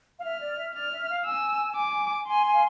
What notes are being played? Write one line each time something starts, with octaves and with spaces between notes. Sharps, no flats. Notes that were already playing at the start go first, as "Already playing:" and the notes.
F5
E5 F6
D5
E5
D5 F6
E5
F5
G#5 E6
D6
G#5 C6
G#5
F5